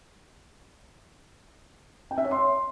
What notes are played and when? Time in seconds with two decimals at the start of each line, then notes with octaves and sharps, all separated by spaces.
2.11 G5
2.18 E5
2.24 C#5
2.31 C6